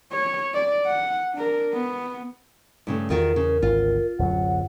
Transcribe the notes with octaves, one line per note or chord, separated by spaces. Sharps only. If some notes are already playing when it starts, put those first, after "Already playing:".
C#5
D5
F#5
D4 A#4
B3
G2 C#3 A3
E2 D#3 F4 F#4 A#4
C#3
G#1 D2 F4
D1 F#2 F#3 F#5